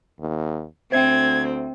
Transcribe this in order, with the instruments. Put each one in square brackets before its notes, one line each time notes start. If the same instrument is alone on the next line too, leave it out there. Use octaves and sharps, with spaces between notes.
[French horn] D#2
[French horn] D2 [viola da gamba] C4 [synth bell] C5 E5 G5 [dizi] G#6